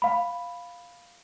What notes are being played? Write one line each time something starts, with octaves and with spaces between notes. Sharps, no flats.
F5 B5